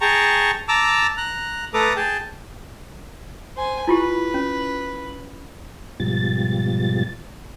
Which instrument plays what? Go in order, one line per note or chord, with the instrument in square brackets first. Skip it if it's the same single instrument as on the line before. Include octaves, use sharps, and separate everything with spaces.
[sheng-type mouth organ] G#4 G5 A5 A#5 C#6
A5 A#5 D6 E6
A#5 F#6
A3 A4 B4 A#5 D6 D#6
G#4 G5 A5
[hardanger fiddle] C5 G#5
[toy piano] E4 F4 G4 [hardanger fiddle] B4
[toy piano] C#4
[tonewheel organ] G#2 B2 F3 G3 A6